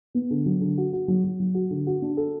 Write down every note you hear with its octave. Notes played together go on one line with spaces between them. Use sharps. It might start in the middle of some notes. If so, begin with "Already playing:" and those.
B3
D3
F#3
D3
F#4
F#4
F#3
F#3
F#3
F#4
D3
F#4
D4
A4